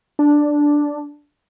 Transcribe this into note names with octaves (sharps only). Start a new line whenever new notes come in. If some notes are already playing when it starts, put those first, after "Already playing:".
D4